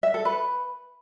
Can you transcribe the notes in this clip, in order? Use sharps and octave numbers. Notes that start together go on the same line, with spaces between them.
E5
A4
B4